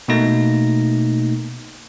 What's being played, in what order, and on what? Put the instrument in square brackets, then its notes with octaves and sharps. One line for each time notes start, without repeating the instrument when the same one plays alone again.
[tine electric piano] B2 A3 A#3 D#4 A#6